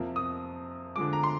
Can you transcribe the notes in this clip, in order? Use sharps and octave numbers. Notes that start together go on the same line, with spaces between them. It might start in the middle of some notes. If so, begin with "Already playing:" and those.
Already playing: F2 C3 F3 A#3
D#6
D3 F3 G#3 D6
A#5
C6